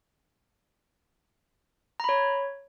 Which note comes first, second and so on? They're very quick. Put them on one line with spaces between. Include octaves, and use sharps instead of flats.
A#5 B5 C#5